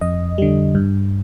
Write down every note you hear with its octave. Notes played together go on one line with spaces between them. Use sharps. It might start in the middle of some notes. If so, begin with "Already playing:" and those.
F2 D#5
D3 G3
G2